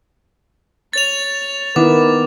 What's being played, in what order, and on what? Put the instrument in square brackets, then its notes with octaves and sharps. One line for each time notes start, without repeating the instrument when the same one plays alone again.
[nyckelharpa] C#5 [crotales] A6 F7
[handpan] D#3 E4 [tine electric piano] B3 [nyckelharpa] A#4 [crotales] D6